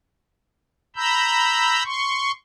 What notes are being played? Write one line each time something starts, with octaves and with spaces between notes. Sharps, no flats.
A#5 B5 E6 G6
C6 C#6